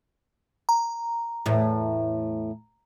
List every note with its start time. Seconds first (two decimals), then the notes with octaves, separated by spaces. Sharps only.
0.69 A#5
1.46 E2 A2